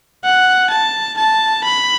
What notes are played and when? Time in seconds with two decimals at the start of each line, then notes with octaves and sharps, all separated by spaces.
0.24 F#5
0.70 A5
1.18 A5
1.64 B5